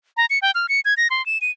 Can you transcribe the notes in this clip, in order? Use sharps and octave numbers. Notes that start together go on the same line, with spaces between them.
A#5
C#7
G5
F6
C#7
G#6
A#6
C6
E7
D#7